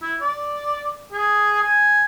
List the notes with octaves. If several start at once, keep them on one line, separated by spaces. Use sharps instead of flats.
E4
D5
G#4
G#5